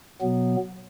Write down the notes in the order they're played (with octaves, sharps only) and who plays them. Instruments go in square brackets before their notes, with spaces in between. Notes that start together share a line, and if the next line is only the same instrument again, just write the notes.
[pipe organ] B2 F#3 B3